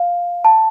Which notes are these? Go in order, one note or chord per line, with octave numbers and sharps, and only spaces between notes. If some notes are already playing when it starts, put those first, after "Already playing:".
Already playing: F5
A5